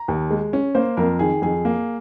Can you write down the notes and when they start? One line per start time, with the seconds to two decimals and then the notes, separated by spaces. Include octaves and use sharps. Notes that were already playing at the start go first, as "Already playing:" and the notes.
Already playing: A#5
0.08 D#2
0.30 G#3
0.53 C#4
0.75 A#3 C5
0.97 F2 A#4
1.19 D#3 G#4
1.42 F2 G#4
1.65 A#3